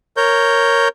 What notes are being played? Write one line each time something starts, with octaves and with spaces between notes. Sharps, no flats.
A#4 C#5 G6